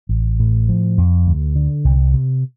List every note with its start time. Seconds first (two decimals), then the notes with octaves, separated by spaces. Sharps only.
0.09 A1
0.40 A2
0.69 F3
0.98 F2
1.27 D2
1.55 D3
1.84 C2
2.14 C3